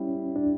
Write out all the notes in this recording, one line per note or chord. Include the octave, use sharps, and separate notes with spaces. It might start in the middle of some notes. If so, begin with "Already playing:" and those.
Already playing: G3 C#4 E4
D4